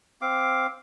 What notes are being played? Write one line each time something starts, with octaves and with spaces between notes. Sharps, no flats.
C4 F5 D6